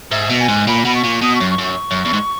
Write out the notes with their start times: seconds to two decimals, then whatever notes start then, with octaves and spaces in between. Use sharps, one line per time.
0.12 G#2 E5
0.30 B2
0.39 G#5
0.48 G#2
0.67 A#2 B5
0.85 B2 B5
0.95 C#6
1.04 A#2
1.22 B2 D#6
1.35 C#6
1.40 F#2
1.50 C#6
1.58 F#2
1.63 C#6
1.91 F#2
2.05 E2
2.13 G#2